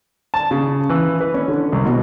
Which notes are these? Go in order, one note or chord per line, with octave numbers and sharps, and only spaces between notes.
A5
C#3
E3
B4
C#4
D3
C2
B2